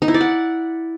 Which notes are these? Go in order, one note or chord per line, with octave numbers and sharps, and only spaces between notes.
D#4
E4
D5
F#5